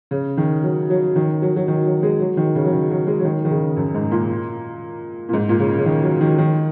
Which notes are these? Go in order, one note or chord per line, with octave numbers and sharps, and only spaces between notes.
C#3
D#3
F#3
F#3
D#3
F#3
F#3
D#3
F#3
G#3
F#3
D#3
C#3
F#3
D#3
F#3
G#3
F#3
D#3
D#3
C#3
F#2
G#2
A#2
A#2
G#2
A#2
C#3
C#3
D#3
F#3
D#3
D#3